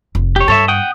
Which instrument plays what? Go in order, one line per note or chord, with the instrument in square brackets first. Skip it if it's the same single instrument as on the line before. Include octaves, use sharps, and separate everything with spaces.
[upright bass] F1
[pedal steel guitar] G4 C#5
[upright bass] G2 [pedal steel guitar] A4 C#5 E5
[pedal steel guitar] F#5 G5 D#6